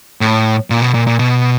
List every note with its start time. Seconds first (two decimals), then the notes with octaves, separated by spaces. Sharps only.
0.21 A2
0.70 A#2
0.82 B2
0.94 A#2
1.07 A#2
1.19 B2